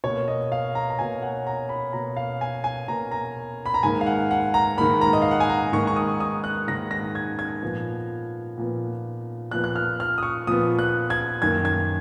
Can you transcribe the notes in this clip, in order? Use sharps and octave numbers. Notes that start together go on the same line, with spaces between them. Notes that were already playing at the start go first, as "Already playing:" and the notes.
B2 A#3 C#5
D#5
F5
A#5
A#5
B2 A#3 G#5
F#5
A#5
B5
B2 A#3 A#5
F5
G#5
G#5
B2 A#3 A#5
A#5
B5
A#5
G#2 D#3 A#3 G#5
F5
F#5
F#5
A#5
G#2 D#3 A#3 B5
A#5
D#5
F5
F#5
G#5
A#5
G#2 D#3 A#3 C#6
C#6
D#6
D#6
F#6
G#2 D#3 A#3 A#6
A#6
G#6
G#6
A#2 F3 B3
A#2 F3 B3
A#2 F3 B3 F#6
F#6
F6
F6
D#6
C#6
A#2 F3 B3 D#6
F#6
G#6
F#2 D#3 A#3 G#6
G#6